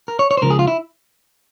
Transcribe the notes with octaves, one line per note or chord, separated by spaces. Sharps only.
A#4
C#5
C#5
C5
C#2 C#3 F3 A#4
G#4
F4
E4